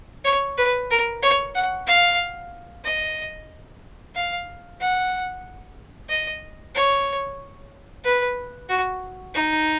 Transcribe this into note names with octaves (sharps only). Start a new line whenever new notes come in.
C#5
B4
A#4
C#5
F#5
F5
D#5
F5
F#5
D#5
C#5
B4
F#4
D#4